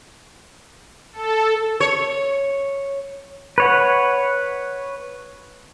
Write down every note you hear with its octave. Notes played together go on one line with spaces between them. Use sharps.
A4
C#5
B4 C#5 F#5